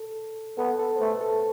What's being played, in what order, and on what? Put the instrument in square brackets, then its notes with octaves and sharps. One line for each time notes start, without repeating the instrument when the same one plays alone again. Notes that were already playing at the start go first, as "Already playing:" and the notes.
Already playing: [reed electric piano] A4
[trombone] B3 [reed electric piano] A4
[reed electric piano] A4
C5
[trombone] A3 [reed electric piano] B4
[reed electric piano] A4